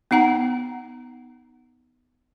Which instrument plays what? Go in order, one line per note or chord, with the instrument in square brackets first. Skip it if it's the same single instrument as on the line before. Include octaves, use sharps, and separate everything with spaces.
[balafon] B3 D#4 F#5 A#5